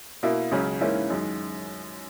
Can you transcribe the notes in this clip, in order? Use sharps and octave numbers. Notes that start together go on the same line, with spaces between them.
B2 A#3 E4
C#2 C#3 F#3 C#4
G#2 E3 A#3 C#4 E4
F#2 D#3 G#3